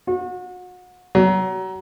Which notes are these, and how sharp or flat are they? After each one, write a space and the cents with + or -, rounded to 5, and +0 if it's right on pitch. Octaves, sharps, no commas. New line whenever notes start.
F#4 -35
F#3 +30